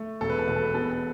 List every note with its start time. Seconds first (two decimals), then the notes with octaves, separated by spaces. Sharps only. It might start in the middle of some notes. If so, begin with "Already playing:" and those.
Already playing: A3
0.21 E1 A4
0.30 B4
0.39 A4
0.48 E1 B4
0.56 A4
0.65 B4
0.74 B2 A4
0.83 B4
0.92 A4